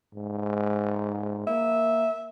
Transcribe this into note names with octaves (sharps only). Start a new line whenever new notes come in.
G#2
A#3 E5